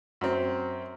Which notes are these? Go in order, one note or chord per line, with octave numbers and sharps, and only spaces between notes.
F#2 C4